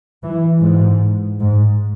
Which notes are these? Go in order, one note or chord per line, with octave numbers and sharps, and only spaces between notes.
E3
G#2
G#2